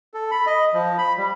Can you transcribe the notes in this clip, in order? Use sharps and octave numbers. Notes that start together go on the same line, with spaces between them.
A4
B5
D#5
F3
B5
G3